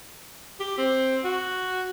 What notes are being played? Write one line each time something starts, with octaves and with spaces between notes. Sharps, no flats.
G4
C4
F#4